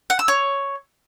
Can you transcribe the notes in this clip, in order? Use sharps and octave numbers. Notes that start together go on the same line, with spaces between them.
F#5
E6
C#5